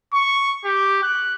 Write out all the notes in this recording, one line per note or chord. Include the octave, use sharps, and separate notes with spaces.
C#6
G4
F#6